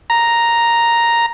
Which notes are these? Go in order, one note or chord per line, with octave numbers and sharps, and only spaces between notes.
A#5